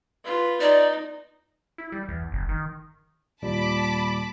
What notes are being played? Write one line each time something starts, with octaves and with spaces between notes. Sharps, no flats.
F4 B4
D#4 D5
E4
G3
E2
F#1
D#3
D#2 A#2 G3 A5 B5 D6